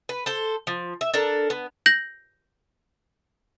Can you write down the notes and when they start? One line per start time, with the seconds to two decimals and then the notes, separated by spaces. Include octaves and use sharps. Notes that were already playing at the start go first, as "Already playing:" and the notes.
0.09 B4
0.26 A4 C5
0.67 F3
1.01 E5
1.14 D4 A4 A#4
1.50 B3
1.86 G6 A#6 F#7